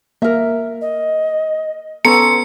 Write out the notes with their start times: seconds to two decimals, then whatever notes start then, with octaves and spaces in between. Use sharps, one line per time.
0.22 A#3 A#4 E5
0.81 D#5
2.05 B3 C#4 A4 A#5 C6 C#7